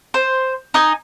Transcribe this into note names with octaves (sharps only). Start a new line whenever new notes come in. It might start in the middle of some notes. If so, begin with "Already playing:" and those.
C5
D#4 D#5 G#5